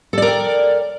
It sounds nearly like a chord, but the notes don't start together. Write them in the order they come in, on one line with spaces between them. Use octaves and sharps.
A4 D5 A#4 G5